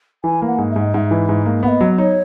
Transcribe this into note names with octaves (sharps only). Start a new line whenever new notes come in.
E3 G#5
A#3
F#5
G#2
E5
G#2
D#5
G#2 E5 F#5
E3
G#2
A#3
B3 F#5
D#5
F#3
D#4 C#5